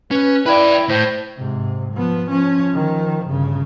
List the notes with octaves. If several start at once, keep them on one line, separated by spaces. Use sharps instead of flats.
C#4 B4
E4 B4 D5 G5
G5
A2 C5
G#2 C3
F3 B3
F3 C#4
D#3 F3
G1 C#3